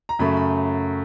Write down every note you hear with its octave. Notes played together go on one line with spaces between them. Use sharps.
A#5
F#2 C#3 F#3 A3 B5
B5